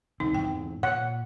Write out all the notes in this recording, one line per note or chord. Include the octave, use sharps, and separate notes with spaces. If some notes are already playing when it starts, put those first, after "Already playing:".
C2 D#3 C4 D#4
E2 G#2 C4 G5
A#2 C#5 F#5